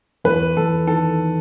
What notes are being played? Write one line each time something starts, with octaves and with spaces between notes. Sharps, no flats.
E2 B4
E2 A4
D#3 A4